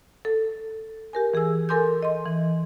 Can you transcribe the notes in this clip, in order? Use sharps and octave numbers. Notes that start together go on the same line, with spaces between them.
A4
G4 A#4 G#5
E3 G#4 G#5 E6
A4 A#4 G#5 C6 D6 G6
D#5 C6
E3